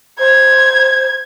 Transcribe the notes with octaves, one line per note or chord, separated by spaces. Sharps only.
C5 G#6